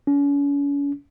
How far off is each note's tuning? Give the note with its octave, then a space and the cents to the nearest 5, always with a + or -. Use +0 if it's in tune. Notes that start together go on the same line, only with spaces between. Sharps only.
C#4 +40